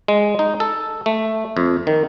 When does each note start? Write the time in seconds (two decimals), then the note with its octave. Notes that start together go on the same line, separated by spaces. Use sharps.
0.08 G#3
0.39 D#4
0.60 A4
1.06 A3
1.57 F2
1.87 D#3